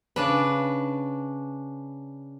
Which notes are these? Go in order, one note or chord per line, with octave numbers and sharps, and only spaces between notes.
C#3 D4 B4